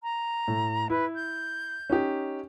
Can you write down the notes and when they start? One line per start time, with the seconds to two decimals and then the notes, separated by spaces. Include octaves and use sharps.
0.03 A#5
0.48 A2
0.90 E4 B4
1.15 G6
1.90 C#4 D#4 G4